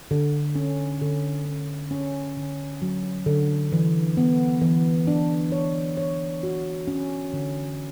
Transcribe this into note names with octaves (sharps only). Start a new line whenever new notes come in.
D3
C#4
D3
C#4
C#4
D3
F#3
D3
E3
B3
E3
D4
C#5
C#5
F#4
C#4
D3